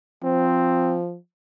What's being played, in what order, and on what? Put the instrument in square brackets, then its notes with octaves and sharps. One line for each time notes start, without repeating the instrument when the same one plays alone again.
[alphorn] F3 [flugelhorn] C4